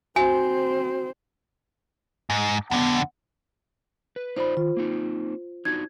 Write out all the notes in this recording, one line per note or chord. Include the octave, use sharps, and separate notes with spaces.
C4 F#4 C5 G#5
G#2
F2 D3 B3
B4
D#4 F4 C5 D5 B5
D#3 F4
A#3 C4 D#4
D4 D#4 F#4 G#6